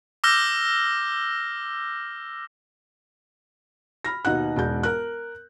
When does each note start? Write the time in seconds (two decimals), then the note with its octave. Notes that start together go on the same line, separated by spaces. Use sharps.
0.24 D6 E6 F6 G6 A#6 G7
4.05 B5 F6 A#6
4.25 D#2 B2 D#4 F#5 F#6
4.57 E1 G#2 G6
4.83 A#4 F#6